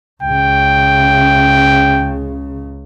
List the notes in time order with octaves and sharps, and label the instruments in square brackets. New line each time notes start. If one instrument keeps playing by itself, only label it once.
[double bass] C#2 C#3 [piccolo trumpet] G5